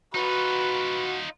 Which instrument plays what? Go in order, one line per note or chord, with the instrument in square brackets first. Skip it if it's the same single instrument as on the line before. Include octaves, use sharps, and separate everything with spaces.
[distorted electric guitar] D#4 F4 [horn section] F#4 [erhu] B4